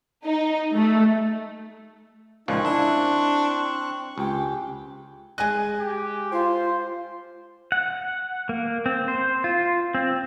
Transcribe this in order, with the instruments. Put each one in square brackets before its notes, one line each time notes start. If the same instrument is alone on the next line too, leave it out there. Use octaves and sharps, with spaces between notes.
[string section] D#4
A3
[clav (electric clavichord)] C#2 A#2 F3 [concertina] C4 C#6 F#6 [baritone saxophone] D#4
[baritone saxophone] D4 [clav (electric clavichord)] E4
[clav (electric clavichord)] C#2 [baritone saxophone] G4
[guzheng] G#3 D#5 [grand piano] G#5 F#6
[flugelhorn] G4
[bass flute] F4 [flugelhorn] C5
[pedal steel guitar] F#5
A#3
C4
C5
F4
C4